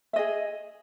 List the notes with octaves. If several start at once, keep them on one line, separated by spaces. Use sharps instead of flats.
G#4 D#5 E5